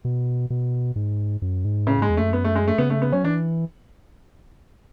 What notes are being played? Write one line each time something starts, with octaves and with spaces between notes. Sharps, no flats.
B2
B2
G#2
F#2
G#2
A2 C#3
G#2 G#3
E2
F#2 A3
B3
A3
G#3
A3
C#3 B3
A3
B3
F#3 C#4
E3 D4